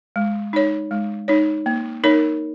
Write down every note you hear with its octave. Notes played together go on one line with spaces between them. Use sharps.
G#3
D#4 C#5
G#3
D#4 C#5
A#3
D#4 A#4 C#5